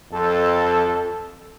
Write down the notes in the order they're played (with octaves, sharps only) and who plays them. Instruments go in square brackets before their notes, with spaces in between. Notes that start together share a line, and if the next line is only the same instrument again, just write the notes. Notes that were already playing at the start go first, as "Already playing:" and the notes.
[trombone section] F2 A4